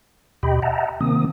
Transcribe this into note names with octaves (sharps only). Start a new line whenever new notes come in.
D#2 B2 G4 D#5 G5 B5
D#5 E5 F#5 G5 A5 A#5
C3 D#3 A#3 C4 D#6